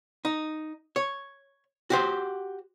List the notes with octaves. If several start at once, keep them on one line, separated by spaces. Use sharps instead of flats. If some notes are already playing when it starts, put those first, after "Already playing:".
D#4
C#5
F#4 G4 C5